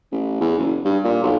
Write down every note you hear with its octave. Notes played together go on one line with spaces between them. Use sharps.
A1
E2
F#1
G2
A#2
B1